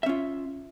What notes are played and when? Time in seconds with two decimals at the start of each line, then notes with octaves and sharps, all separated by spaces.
0.03 E5
0.06 C#4
0.09 F4